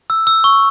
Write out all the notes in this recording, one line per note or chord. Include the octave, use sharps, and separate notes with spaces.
E6
E6
C#6